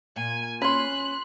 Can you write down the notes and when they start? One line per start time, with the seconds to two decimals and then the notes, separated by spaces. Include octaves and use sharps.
0.16 A#2 G#5
0.62 C#4 B5 C6 F#6